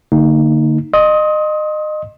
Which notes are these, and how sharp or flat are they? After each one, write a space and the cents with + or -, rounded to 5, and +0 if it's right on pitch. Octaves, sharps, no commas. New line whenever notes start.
D3 +5 A#3 -30 D#4 +0
D#5 -25 C6 +30 D#6 +25